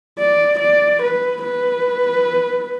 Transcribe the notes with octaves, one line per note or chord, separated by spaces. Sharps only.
D5
D5
B4
B4